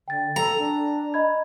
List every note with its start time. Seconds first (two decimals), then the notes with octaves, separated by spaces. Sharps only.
0.08 D3 G5 A6
0.36 A4 A#5
0.58 D4
1.14 D#5 B5 G#6